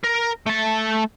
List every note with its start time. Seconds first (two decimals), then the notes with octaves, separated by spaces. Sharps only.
0.04 A#4
0.46 A3 A5